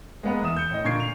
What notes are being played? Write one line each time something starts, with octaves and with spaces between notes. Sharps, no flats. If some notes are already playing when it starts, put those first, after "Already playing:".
G#3 A#3 B3 B4 F#5
E2 E5 D#6 E7
G6 C#7
A2 D#5
A#2 D3 C#6 G#6 C7 D7
F7